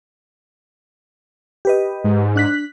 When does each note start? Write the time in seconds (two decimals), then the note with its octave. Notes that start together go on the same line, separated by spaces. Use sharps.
1.65 G4 B4 D#5
2.04 G#2
2.36 D4 F#6 B6